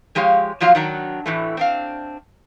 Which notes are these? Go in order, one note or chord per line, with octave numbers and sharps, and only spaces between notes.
F3 G#3 G4 C#5 F5
A#2 F3 F#3 F4 F5
D#3 F#3 D4
A2 E3 A3
C4 D4 F5